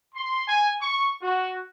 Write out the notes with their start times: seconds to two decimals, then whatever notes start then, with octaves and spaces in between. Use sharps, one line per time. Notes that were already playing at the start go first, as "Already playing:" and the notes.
0.15 C6
0.47 G#5
0.80 C#6
1.21 F#4